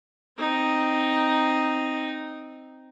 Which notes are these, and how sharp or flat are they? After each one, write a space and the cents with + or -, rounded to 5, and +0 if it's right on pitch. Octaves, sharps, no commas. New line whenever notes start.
C4 +0 D#4 +0